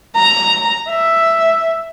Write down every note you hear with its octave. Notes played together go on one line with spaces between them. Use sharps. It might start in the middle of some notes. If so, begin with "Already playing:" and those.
A#5
E5